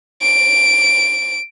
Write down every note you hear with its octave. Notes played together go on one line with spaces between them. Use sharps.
D7